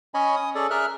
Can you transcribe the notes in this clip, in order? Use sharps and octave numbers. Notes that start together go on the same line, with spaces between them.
C#4 C#5 D#5 G#5 B5
D#6
C#4 G#4 A4 D5
G#4 A#4 E5 F6 F#6